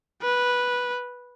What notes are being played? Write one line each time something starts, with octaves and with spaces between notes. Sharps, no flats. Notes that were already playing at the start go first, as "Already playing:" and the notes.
B4